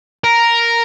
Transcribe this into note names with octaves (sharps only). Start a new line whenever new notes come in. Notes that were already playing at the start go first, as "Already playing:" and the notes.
A#4